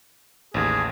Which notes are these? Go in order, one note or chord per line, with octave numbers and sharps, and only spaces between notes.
A1 D#2 G#4